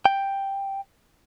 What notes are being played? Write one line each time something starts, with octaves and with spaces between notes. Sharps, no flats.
G5